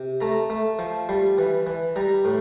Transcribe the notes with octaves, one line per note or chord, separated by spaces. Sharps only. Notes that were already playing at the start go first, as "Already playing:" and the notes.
Already playing: C3
A3 A#5
A3
F3
G3 C6
E3
E3
G3 A#5
A2